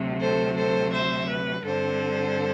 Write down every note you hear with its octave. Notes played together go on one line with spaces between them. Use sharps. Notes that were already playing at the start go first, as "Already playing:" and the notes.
Already playing: D2 C3 F#3
A4 C5
A4 C5
C5 E5
B4
G2 D3 G3 C4 A4 C5